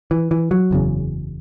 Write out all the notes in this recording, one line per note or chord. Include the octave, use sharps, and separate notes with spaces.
E3
E3
F#3
F#1 E2 C#3